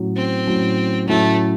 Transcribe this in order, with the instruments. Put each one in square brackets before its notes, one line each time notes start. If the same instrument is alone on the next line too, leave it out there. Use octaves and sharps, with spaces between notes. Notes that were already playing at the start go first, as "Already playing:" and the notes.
Already playing: [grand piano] A2 F#3 C#4
[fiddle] C4
[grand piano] A2 F#3 C#4
[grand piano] A2 F#3 C#4 [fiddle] A3